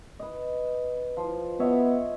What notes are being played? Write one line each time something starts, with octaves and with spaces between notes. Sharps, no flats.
B4 D#5
F3
B3 C#5 D#5 E5